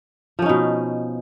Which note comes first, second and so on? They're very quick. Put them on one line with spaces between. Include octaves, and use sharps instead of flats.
F3 C#4 D#4 B2